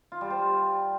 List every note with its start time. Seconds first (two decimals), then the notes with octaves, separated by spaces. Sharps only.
0.12 F4
0.21 G3
0.30 C5